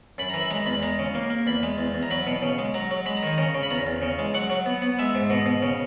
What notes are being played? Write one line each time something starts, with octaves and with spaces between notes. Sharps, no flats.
F#2 B5
E3 A#5
B5
G#3 A#5
E2 B5
G#3 A#5
C#3
A#3
A#3
E2 B5
G#3
E2
E2
A#5
F#3 B5
B2
C#3
G#3
F#3 A#5
F#3
G#3 B5
A#5
D#3 G#5
C#3 A#5
C#3
B5
E2 A#5
E2
C#3
G#3
F#3 F#5
F#3
B3
B3
G#3 E5
G#2
B2 D#5
B2
C#3